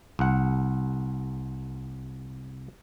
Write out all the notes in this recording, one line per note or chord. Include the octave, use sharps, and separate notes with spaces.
C2 F#5